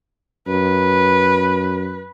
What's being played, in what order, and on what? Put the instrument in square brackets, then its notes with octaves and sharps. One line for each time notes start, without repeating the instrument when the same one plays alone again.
[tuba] F#2 [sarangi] B4